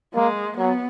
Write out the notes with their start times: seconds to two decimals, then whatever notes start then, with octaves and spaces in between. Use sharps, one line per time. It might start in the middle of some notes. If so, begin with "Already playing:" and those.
0.15 G#3 A#3
0.57 F#3 B3